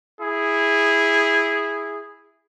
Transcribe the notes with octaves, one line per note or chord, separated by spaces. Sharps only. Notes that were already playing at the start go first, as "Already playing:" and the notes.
E4 G#4